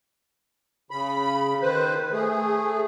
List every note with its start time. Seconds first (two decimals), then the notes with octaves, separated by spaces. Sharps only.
0.91 C#3 B5
1.62 D#3 B4 C5
2.12 A3 G#4